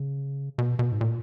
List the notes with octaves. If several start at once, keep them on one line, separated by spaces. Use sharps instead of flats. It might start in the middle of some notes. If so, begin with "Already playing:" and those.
Already playing: C#3
B2
B2
G#2
A#2